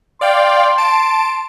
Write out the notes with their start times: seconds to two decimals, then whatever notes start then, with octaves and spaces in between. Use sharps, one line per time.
0.21 D5 F5 G5 C6
0.78 A5 D7